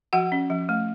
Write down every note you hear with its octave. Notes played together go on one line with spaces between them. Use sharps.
F3 F#4 F#5
C#4
F3
A3